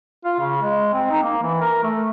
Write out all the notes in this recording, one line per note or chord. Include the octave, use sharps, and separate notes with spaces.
F4
C#3
G#3
C4
D#4
A#3
E3
A#4
A3